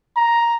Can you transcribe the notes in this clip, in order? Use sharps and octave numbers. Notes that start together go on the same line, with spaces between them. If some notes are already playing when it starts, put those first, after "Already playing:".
A#5